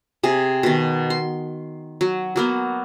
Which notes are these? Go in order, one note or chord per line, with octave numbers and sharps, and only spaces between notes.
C3 G#4
B2 D#3
C6
F#3
F#3 A#3 B3